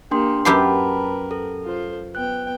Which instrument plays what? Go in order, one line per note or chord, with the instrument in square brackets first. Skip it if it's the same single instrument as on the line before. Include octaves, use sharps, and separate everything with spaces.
[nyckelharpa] A#3 G4 [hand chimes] D4 G5 C6
[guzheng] F#2 G4 C6 [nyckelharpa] A#4 B4 [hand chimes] A5 B5
[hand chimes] A4
[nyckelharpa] F4 C5
[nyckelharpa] B3 G5 [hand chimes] F#6